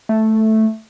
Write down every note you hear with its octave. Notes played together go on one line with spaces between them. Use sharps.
A3